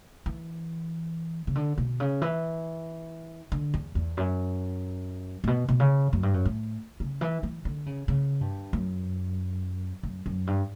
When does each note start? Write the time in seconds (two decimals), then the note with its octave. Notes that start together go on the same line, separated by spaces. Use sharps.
0.26 E3
1.47 C#3
1.55 D3
1.78 B2
2.00 C#3
2.22 E3
3.52 D3
3.74 E2
3.95 E2
4.17 F#2
5.44 A2
5.47 B2
5.69 B2
5.80 C#3
6.13 F#2
6.23 G2
6.34 F#2
6.45 A2
7.00 C#3
7.21 E3
7.43 E3
7.65 D3
7.86 C#3
8.08 C#3
8.41 G2
8.73 F#2
10.03 F#2
10.26 F#2
10.47 G2